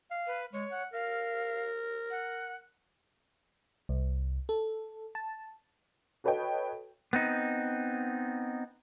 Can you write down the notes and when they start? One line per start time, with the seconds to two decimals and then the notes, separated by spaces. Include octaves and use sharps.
0.11 F5
0.27 B4
0.53 G#3 C#5
0.72 F#5
0.93 A#4 F5
2.11 F#5
3.89 C2
4.49 A4
5.15 A5
6.24 F#4 A4 B4 C#5 D#5 G5
7.13 B3 C4 D#4